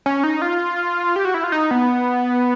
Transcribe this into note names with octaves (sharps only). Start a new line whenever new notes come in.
C#4
D#4
F4
G4
F#4
E4
F4
D#4
B3